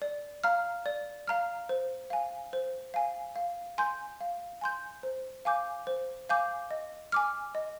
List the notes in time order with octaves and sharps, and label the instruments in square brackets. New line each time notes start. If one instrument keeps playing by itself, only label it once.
[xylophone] D5
F5 A#5 F6
D5
F5 A#5 F6
C5
F5 G#5
C5
F5 G#5
F5
G#5 C6 G6
F5
G#5 C6 G6
C5
F5 G#5 D6 G6
C5
F5 G#5 D6 G6
D#5
G#5 D6 F6
D#5